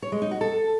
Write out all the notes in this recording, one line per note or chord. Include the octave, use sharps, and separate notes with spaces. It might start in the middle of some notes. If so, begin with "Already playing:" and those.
C#5
G#3
D#4
F#4
A4